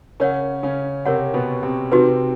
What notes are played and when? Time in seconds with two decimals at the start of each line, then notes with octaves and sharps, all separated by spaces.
0.20 C#3 C#4 A#4 C#5 F#5
0.63 C#3 C#4
1.05 C3 C4 A#4 C#5 F#5
1.34 B2 B3
1.62 C3 C4
1.91 C3 C4 D#4 F#4 B4